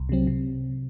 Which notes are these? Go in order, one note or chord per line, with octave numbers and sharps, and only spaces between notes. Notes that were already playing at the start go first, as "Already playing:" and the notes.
Already playing: C2
C3 F#3 C4
C3